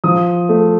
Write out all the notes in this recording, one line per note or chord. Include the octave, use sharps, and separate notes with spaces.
F3 D#6
A3